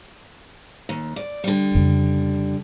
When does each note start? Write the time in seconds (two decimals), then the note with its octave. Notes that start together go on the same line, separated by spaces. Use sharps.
0.89 D#2
1.16 D5
1.44 D3 G3
1.75 F2 C#3